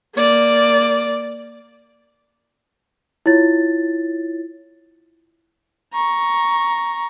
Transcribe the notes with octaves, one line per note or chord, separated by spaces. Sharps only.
A#3 D5
E4 F4 C#5 A6
A#5 C#6